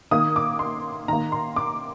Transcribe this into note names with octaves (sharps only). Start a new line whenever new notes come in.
D#3 A#3 D#6
D6
C6
D#3 A#3 A#5
C6
D6